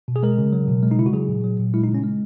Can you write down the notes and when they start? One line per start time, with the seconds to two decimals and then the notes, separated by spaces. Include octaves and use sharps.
0.08 B2
0.16 G#4
0.23 G#3 A#4
0.38 C#3
0.53 F#3
0.68 B2
0.83 G#3
0.91 D#4
0.98 C#3 E4
1.06 F#4
1.13 F#3 G#4
1.28 A#2
1.44 F#3
1.59 A#2
1.74 G#3 E4
1.84 D#4
1.89 C#3
1.95 C#4
2.04 G#3